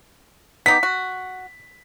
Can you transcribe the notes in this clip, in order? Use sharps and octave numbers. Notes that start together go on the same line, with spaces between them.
B3 D#4 G4 B6
F#4